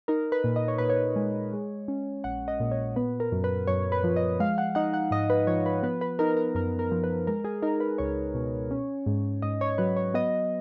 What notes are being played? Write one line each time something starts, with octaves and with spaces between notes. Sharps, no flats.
D#4 A#4
B4
A#2
D#5
C#5
A#2 B4
C#5
G#3
G#3
C#4
A#1 F#5
D#5
A#2
C#5
B3 B4
A#4
F#2
B4
F#2 C#5
B4
F3
D#5
G#3 F5
F#5
D#4 F#5
F#5
G#2 D#5
B4
F3 C#5
B4
B3 B4
B4
D#4 A#4
A#4
F#2 A#4
A#4
F3
B4
G#3 A#4
G#4
D#4 A#4
B4
C#2 C#5
B2
C#4
G#2
G#2 D#5
C#5
F#3 B4
C#5
B3 D#5